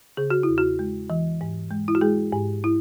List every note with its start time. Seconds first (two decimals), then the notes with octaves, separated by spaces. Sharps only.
0.17 C#3 G#4
0.30 F#4
0.43 E2 E4
0.58 F#4
0.79 G#3
1.10 E3
1.41 G#2
1.71 G#3
1.88 E4
1.95 F#4
2.01 G#3 G#4
2.32 G#2
2.64 E4